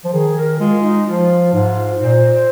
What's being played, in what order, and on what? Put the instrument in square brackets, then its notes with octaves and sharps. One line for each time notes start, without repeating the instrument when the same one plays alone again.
[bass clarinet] F3
[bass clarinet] D#3 [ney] G#4
[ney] A#4
[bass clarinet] G#3 [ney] F4
[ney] D#4
[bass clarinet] F3 [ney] F4
[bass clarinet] G#2
[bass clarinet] A#2 [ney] C5